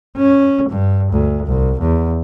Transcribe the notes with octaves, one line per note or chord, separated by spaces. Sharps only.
C#4
G2
D2
C2
E2